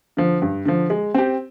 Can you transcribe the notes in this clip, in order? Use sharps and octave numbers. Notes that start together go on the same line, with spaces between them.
D3 F3
G2
D3 F3
G#3
C4 G4